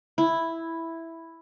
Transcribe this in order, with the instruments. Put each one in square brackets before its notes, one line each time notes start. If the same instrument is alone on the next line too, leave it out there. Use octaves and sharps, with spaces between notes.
[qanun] E4